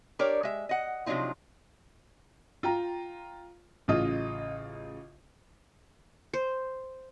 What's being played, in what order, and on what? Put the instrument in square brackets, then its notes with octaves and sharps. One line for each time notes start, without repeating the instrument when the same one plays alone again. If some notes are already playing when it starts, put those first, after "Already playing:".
[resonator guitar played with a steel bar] D4 G4 A#4 C#5 D5
G#3 E5
D#5 F#5
C3 F3 F#3 D4 D#4 F4
[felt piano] F4 G5 A#5
A1 C#3 F4 D#5 D#6
[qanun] C5